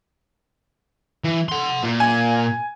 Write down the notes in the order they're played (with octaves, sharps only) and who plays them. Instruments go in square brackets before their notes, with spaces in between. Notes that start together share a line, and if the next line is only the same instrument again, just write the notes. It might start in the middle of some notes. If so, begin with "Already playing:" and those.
[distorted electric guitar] E3
F#5 C6
A#2
[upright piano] G#5